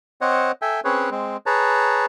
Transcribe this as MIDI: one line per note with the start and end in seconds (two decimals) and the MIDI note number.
0.21 0.52 60
0.21 0.52 72
0.21 0.52 73
0.21 0.52 75
0.21 0.52 78
0.62 0.80 69
0.62 0.80 76
0.62 0.80 79
0.62 0.80 80
0.85 1.10 60
0.85 1.10 61
0.85 1.10 68
0.85 1.10 71
0.85 1.10 73
1.11 1.37 56
1.11 1.37 60
1.46 2.06 68
1.46 2.06 71
1.46 2.06 73
1.46 2.06 81
1.46 2.06 82